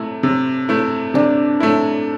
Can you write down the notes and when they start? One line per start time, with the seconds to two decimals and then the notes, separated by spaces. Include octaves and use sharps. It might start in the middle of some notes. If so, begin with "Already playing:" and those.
Already playing: C3 A3 E4
0.23 C3
0.69 A3 E4
1.14 C3 D4
1.60 A3 E4